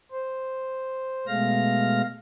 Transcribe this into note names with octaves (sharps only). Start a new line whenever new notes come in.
C5
B2 G#3 A3 F5 F6 A#6